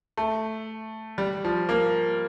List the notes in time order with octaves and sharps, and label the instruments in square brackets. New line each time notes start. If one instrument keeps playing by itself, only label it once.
[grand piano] A3
G3
F3
A#3